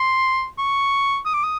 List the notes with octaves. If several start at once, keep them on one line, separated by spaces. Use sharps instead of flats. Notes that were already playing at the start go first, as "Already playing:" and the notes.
Already playing: C6
C#6
D#6
D6
D#6